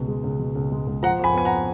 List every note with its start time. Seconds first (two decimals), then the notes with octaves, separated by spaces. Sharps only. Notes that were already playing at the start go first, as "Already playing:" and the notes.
Already playing: C#2 B2
0.08 G#3
0.24 C#2
0.39 B2
0.55 C#2
0.72 G#3
0.87 C#2
1.03 F3 F#5 A#5
1.19 F2 G#5 B5
1.34 B3 G#5
1.45 F#5 A#5